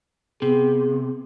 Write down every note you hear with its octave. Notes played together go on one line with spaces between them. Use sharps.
C3 B3 G#4